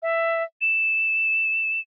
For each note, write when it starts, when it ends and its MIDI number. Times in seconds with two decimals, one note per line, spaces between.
0.02 0.43 76
0.61 1.80 100